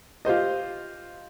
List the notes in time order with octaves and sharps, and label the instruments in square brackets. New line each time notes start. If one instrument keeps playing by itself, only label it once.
[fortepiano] F4 G4 C5 D#5